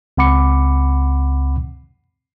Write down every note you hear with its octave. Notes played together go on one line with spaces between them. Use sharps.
C#2 C4 F#5 B5 D6 C#7